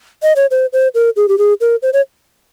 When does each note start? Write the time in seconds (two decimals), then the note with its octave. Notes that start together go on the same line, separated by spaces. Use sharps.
0.23 D#5
0.36 C#5
0.51 C5
0.73 C5
0.95 A#4
1.16 G#4
1.28 G4
1.38 G#4
1.61 A#4
1.82 C5
1.93 C#5